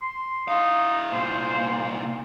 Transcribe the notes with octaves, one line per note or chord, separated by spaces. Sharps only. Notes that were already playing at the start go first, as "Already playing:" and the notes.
C6
D#4 E4 F5
C2 A#2 C5